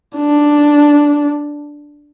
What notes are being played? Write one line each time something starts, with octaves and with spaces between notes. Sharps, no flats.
D4